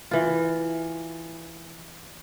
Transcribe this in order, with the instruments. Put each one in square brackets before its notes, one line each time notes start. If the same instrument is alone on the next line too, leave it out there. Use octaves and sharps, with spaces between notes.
[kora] E3 F4